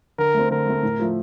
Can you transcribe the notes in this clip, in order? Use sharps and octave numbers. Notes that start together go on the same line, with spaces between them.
D3 A#4
A3 C4
D3 A#4
A3 C4
A2
F3 A3